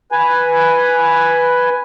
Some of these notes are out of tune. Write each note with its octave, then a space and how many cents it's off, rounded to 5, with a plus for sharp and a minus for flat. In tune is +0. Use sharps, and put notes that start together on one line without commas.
B4 +0 G#5 +0